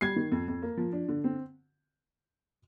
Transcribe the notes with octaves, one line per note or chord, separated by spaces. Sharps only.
G3 G#6 C7
D#3
F2
F2
A#3
F3
D4
D3
C4